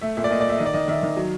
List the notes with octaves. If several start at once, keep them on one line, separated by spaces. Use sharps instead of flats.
A3 E5
A#2 E5
D5
A#2 D#5
D5
A3 E5
D#3 D#5
D5
D#3 D#5
D#3 E5
D#3
F#3